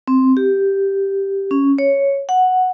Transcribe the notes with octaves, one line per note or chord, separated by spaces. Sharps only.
C4
G4
C#4
C#5
F#5